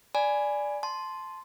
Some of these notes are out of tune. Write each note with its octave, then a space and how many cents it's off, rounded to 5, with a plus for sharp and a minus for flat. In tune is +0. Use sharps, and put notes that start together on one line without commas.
D5 +0 G#5 +0 B5 +5
A5 -20 C6 +0